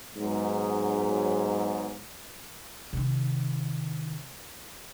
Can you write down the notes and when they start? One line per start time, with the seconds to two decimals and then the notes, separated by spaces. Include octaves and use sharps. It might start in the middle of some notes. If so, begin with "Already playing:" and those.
0.16 G#2 F#3 B3
2.93 C3 D#3